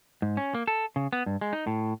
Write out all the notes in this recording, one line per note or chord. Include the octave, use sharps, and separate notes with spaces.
G#2
C#4
A#3
A4
C#3
B3
G2
G#3
D#4
A2